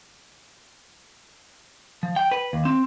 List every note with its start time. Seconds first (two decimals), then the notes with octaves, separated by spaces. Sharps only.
2.03 F3
2.16 G5
2.31 B4
2.53 D#2
2.65 C4